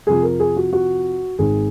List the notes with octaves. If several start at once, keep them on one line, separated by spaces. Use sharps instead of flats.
F2 C3 F3 G#4
A#4
G#4
F#4
F#4
G#1 G#2 D#3 G#4